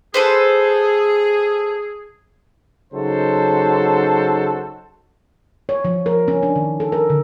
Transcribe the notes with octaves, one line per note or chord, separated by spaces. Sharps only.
G#4 A4 B4 C5
C#3 F#3 D#4 F#4 A4 C5
C#5
F3
A#4
C#4
D4
D#3
A4
A#4
D3